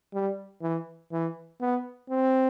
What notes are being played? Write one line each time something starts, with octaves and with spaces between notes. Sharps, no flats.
G3
E3
E3
B3
C4